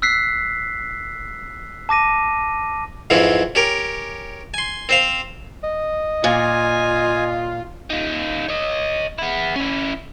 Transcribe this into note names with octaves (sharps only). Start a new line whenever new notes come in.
E6 F#6 B6 C7
A5 D6 A#6 D#7
F2 G#2 E3 C4 C#4
C#4 G4 A#4
G#5 C6
C4 C5 F5
D#5
A#2 F4 G#5
D#4 F4
C#5 D#5
B3 E4
C#4 E4